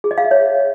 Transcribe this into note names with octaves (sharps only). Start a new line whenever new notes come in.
G#4
D#5
F5
E5
C#5